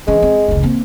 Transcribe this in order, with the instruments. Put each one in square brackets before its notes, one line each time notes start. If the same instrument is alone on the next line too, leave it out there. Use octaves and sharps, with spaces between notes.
[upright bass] E3 C#4 [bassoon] G#3
[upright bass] C4
F1 C#2
A#3 C4